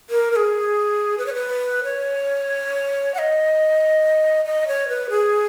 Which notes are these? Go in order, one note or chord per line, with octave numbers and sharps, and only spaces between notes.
A#4
A#4
G#4
B4
C#5
B4
C#5
F#5
D#5
D#5
C#5
B4
G#4